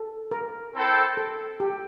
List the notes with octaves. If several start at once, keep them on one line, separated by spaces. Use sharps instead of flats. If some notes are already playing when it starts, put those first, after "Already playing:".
Already playing: A4
A#4
C4 E4 A4 C5 G5
A4
G4